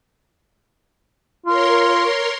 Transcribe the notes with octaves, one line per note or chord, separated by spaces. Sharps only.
F4 A#4 C#5 C6